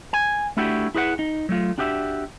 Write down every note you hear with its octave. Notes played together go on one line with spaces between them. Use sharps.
G#5
A3 D4 E4 F#4 G4
E4 G#4 B4 D5 F#5
D#4
F#3 A3 F4
D4 F#4 G4 D5 E5